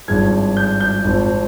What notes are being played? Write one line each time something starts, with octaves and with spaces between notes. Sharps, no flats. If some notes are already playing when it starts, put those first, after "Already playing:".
G#1 G2 F3 G#3 G#6
G6
G6
G#1 G#2 F3 C4